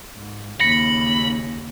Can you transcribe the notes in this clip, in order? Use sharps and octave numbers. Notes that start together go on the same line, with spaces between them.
G#2
D#2 C#3 B5 A#6 C#7